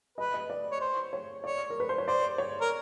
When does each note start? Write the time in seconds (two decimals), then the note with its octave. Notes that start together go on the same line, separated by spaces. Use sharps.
0.18 B4 D#5
0.34 D#5
0.50 D5
0.71 C#5
0.81 C5
1.13 C#5
1.44 C#5 D5
1.70 A#4
1.80 B4
1.89 C5
1.98 C#5
2.07 C5 D5
2.38 C#5
2.61 A#4